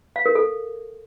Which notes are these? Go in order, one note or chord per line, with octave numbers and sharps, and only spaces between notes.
F5
A#4
A4